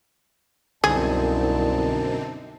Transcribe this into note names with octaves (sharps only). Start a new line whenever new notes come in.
C2 F#2 B2 D3 C4 D#4 G#4 A5